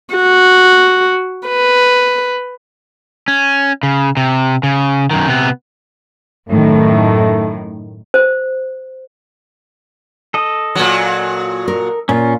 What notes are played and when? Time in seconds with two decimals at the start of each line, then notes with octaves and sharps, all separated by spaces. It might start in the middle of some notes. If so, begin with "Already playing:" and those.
0.14 F#4
1.48 B4
3.28 C#4
3.83 C#3
4.17 C3
4.63 C#3
5.11 F#2 D#3
5.27 C3 B3
6.49 F#2 A2 D#3 A3
8.14 C5
10.34 A4 D#5
10.75 A#2 F#3
11.68 A#4
12.09 A#2 C#4 F4